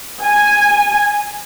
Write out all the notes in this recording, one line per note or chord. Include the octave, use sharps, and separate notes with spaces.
G#5